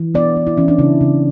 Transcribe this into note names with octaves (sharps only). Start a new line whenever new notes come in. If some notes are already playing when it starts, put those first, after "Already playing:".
Already playing: E3
B3 D5
B3
E4
E3 C#4
D4
C#3 E4
C#3